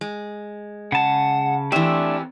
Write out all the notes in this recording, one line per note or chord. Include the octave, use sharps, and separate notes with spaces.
G#3
C#3 F#5 A5
E3 A3 C4 D4 G4 A4 E5